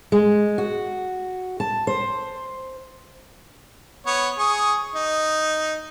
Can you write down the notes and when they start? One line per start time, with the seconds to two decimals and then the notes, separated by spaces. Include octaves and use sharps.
0.12 G#3
0.58 F#4
1.60 A5
1.87 C5
4.07 B3 C#5
4.39 G#4 C#6 D#6
4.96 D#4